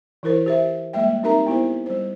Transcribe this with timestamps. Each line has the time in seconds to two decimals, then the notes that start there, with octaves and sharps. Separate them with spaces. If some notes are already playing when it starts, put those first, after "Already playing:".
0.23 E3 E4 A#4 C5
0.46 G4 C5 E5
0.93 G3 G#3 A#3 E5 G5
1.23 C4 D#4 G4 A#4 E5 A#5
1.46 B3 E4 G4 C5
1.86 G3 C5